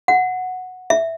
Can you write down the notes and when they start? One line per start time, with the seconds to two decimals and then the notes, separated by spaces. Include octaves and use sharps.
0.08 F#5
0.90 E5